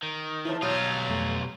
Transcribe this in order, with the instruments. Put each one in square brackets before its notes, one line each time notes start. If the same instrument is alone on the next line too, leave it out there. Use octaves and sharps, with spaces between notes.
[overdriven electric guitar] D#3
[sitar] E2 A2 F3 [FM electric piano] E4
[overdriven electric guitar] B1 F4 [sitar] F#3 G3 [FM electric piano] D#6 G6
[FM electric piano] F2 A3